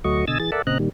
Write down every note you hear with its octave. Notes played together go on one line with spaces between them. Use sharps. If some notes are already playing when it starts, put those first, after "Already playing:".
D2 F#3 A3 F#4 D#5 C#6
B2 D3 D#5 G#5 E6 A6
E3 G#4 A6
A4 A#4 D5 E5 F#5 A5
A#2 C#3 C4 D#5 A#5 F#6
A#2 D#3 G3